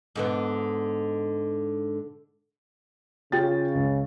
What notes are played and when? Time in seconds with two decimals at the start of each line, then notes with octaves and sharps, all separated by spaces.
0.16 G#2 D3 B3
3.32 C#3 F4 G5 A6
3.75 C#2